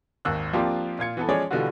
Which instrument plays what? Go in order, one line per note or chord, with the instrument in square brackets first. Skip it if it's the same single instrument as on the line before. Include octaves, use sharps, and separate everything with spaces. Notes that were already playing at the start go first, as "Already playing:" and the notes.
[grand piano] G#1 D#2 E6 F#6
F3 A#3 C4 D4 F4 G4
A#2 F4 G#6 C#7
E3 B3 A4
F3 G#3 C#4 G#4 C#5 D5
B2 D3 E3 G3 F4 F#4